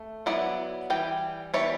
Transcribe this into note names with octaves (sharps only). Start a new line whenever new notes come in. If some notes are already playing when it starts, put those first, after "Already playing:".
Already playing: A3
F#3 B3 E4 D5 F#5
E3 G3 G5
E3 G3 B3 C#5 E5